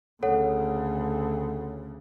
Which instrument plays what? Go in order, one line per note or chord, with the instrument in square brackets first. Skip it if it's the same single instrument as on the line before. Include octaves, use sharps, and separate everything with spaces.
[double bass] D2 C#3 [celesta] A4 C#5 F#5